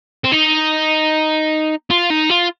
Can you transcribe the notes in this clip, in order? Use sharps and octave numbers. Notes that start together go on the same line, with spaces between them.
C4
D#4
F4
D#4
F4